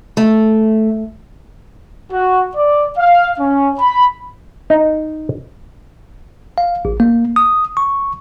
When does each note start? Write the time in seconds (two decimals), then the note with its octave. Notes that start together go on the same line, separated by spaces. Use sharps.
0.17 A3
2.13 F#4
2.56 D5
2.98 F5
3.39 C#4
3.79 B5
4.70 D#4
6.58 F5
6.85 A1
7.00 A#3
7.36 D#6
7.77 C#6